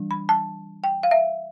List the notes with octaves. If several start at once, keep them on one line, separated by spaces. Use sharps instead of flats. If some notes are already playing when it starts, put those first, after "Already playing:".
Already playing: E3 G3 D4
B5
A5
G5
F5
E5